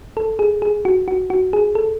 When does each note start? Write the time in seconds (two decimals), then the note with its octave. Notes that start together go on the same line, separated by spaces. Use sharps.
0.17 A4
0.39 G#4
0.62 G#4
0.85 F#4
1.08 F#4
1.30 F#4
1.53 G#4
1.75 A4